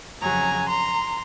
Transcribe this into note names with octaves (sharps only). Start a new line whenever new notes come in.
F2 C#3 F#3 G#5 A#5
A#5 C6